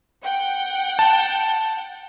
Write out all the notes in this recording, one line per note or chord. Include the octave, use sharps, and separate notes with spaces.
F#5 G5
A5